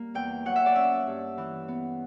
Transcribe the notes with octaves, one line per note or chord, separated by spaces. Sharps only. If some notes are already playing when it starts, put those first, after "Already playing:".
Already playing: G3 A#3
E2 G5
F#3 F#5
E5
D5
C#4 E5
G2
E3
B3